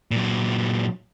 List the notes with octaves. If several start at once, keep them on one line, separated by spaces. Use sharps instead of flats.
A#2 F#3